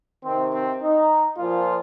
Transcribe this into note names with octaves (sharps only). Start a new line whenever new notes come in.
C3 D#3 C4
C4
D#4
A#2 F3 F4